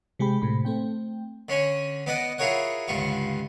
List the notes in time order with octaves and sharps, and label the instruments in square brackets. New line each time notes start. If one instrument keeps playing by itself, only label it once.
[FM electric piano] C3 G#3 G4 G5 B5
A2 C3 B5
A3 C4 G5
[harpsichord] D3 C#4 C#5 G#5
B3 B4 D5 D#5 F#5
E4 F4 G#4 A#4 C#5 F#5
C#2 G2 D3 F4 C#6